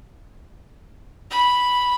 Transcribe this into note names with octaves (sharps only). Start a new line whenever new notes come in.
B5